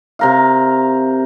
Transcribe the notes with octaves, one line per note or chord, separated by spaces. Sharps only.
C3 A#4 F5